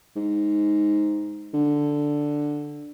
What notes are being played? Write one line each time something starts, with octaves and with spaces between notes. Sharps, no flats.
G#2
D3